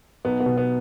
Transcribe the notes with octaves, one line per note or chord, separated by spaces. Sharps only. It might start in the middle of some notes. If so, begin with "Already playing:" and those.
B1 B3
B3
B2
B3